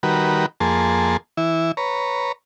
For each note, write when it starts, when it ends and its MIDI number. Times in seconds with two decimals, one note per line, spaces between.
0.03 0.46 51
0.03 0.46 55
0.03 0.46 66
0.03 0.46 70
0.03 0.46 71
0.60 1.17 41
0.60 1.17 58
0.60 1.17 68
0.60 1.17 81
0.60 1.17 84
1.37 1.72 52
1.37 1.72 64
1.77 2.32 71
1.77 2.32 73
1.77 2.32 82